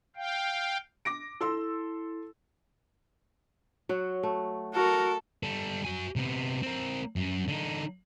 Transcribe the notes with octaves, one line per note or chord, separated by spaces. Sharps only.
F5 G5
D6 A#6 D7
E4 A4 C6 E6
F#3 F#4
A3
F#4 A4 A#4
G3 A4
F#4 G#5
C3 B3
C4 A#4
F#2
D3 D#4